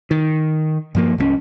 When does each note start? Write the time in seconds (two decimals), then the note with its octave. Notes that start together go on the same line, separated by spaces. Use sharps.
0.11 D#3
0.95 G2 F3 A#3
1.18 C2 G3 C#4